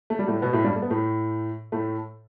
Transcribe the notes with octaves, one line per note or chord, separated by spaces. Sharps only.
A3
G3
A2 A3
B2 B3
A2 A3
G2 G3
A3
B3
A2 A3
A2 A3